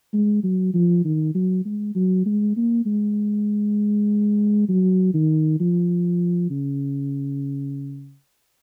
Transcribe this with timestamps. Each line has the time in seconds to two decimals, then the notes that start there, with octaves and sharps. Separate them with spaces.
0.13 G#3
0.43 F#3
0.74 F3
1.05 D#3
1.34 F#3
1.65 G#3
1.95 F#3
2.26 G#3
2.57 A#3
2.86 G#3
4.69 F#3
5.14 D#3
5.60 F3
6.50 C#3